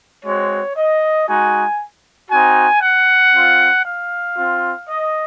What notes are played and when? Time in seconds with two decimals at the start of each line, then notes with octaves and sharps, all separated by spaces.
0.25 G#3 C4 F#4 C#5
0.77 D#5
1.28 G#3 D#4 F#4 G#5
2.31 C4 D#4 F#4 G#5
2.82 F#5
3.34 C4 F4
3.85 F5
4.37 C4 F4
4.88 D#5